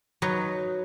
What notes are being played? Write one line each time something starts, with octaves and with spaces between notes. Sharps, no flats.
F#3 D#4 B4